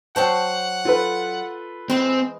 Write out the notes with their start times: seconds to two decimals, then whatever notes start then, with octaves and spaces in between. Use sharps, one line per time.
0.16 F#3 C5 F#5 G5 A5 C#6 G6
0.85 F4 A4 B4
1.90 E3 G#3 C4